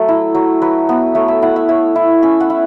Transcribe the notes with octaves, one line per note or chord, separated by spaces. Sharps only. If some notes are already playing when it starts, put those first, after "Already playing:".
Already playing: F#3 A3 A4
E4
F#3
F#3 B4
B3
A3 C#5
E5
E4 F#5
E5
A3 C#5
E4
C#4 E5
F#5
E4